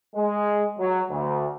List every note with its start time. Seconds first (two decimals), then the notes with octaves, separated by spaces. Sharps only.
0.15 G#3
0.79 F#3
1.10 D2